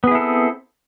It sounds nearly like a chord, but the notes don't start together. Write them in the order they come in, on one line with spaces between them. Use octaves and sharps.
B3 G#4 E4 A4 C4